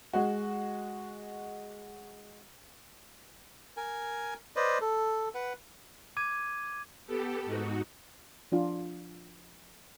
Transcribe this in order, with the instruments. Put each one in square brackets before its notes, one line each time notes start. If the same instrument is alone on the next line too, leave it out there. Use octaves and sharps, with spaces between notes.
[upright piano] G#3 F#4
[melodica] A#4 G#5
B4 C5 D5 D#5
A4
B4 F#5
[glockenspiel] D6 G#6 D#7
[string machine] B3 G4 A4
G#2 D#4 F#4
[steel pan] F3 D4 F4